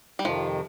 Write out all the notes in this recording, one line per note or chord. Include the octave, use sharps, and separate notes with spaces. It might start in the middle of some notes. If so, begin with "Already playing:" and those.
G3
F2 C3 D#3 F3